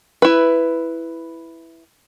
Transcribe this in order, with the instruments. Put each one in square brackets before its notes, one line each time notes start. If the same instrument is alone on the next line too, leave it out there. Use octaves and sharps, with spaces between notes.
[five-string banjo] E4 B4